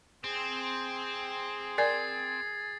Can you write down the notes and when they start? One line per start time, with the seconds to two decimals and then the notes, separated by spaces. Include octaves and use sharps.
0.24 C4 G#4
1.78 A#4 D5 G#5 G#6 A6 C7